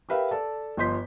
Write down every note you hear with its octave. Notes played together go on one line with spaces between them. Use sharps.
G4 A#4 B4 E5 F5 G5
A4 D5 A5
G1 F3 D#5 C6 G6 B6